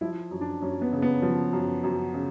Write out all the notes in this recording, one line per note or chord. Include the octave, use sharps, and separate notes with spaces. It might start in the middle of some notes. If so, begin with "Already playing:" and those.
F3 E4
F#2
D4
F#2 C#4
B3
C#3
B3
F3
F#2
F#2
C#3